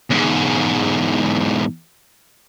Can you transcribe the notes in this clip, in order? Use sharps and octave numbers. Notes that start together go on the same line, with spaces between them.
E2 G#2